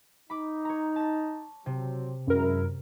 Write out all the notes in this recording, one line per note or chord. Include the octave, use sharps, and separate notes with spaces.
D#4 B5 D6
C#5 A#5
A5 A6
C3 F#3 C4
F#2 G#3 E4 A#4